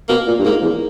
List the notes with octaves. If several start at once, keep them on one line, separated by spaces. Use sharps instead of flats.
B2 A#3
A#2
G2
G#2 A#3
E2